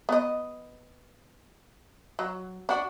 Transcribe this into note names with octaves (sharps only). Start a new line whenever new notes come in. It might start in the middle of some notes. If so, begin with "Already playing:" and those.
B3 D#5
F#3
D4 F#4